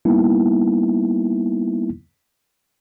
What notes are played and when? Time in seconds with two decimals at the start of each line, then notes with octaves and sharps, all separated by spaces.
0.05 G3 A#3 B3 D#4 E4